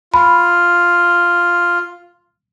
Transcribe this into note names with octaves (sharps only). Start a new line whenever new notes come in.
F4 B5